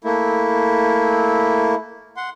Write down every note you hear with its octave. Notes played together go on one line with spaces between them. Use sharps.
A3 A#3 E4
F#5 C6